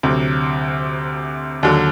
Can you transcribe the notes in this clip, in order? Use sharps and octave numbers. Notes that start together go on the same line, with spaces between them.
D2 C3 F#3
D#2 D3 F#3